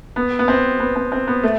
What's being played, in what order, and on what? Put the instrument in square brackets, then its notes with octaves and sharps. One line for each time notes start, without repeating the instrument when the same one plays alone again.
[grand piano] B3
B3
C4
B3
C4
C4
B3
A3